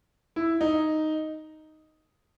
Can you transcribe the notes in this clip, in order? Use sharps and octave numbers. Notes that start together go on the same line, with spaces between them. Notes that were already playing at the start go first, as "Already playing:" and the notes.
E4
D#4